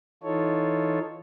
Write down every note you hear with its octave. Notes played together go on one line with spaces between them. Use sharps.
E3 D#4 F4 A4 C#5